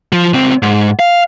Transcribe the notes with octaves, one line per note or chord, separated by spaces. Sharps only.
F3
C#2 C4
G#2
F5